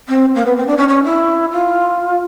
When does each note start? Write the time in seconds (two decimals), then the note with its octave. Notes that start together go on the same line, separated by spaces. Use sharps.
0.08 C4
0.35 A#3
0.45 B3
0.56 C4
0.66 D4
0.77 C#4
0.88 C#4
1.03 E4
1.51 F4